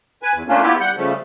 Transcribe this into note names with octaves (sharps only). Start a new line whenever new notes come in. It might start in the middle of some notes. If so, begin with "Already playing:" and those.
B4 G#5
E2
A3 A#3 C#4 D4 F4
B3 E4 F4 G4
G3 F#5 G6
C#3 F3 G3 A3